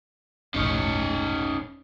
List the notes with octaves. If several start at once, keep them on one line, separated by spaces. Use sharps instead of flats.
F1 B1 A2 C#4 D#4 C#5